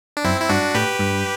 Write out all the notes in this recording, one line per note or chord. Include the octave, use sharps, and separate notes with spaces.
D4
F#2 C4 E4
E4
G2 D4 F#4
A2 G4 B4
G2